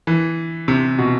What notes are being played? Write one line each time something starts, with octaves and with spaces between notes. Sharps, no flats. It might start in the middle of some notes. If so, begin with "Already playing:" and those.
E3
C3
B2